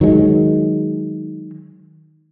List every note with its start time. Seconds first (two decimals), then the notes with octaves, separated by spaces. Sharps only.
0.01 D#3 F#3 G#3